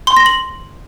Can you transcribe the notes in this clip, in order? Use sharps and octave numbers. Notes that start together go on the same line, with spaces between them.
C6
A#6
F#7